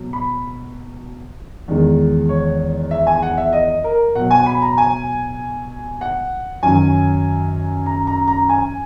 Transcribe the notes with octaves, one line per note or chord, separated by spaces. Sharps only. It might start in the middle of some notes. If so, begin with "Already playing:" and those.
Already playing: B2 F#3
B5
E2 D#3 G#3
C#5
E5
G#5
F#5
E5
D#5
A#4
B2 F#3 F#5
G#5
B5
A#5
G#5
F#5
F#2 D#3 F#3 G#5
A#5
A#5
A#5
G#5